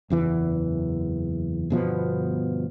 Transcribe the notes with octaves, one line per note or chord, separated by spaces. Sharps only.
F#1 E2 E3
G1 B2 F3 B3